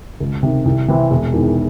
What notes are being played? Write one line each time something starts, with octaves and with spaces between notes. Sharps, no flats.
C#2
C3 D#3
C2
C3 E3 C4 E4
E1
E2 D#3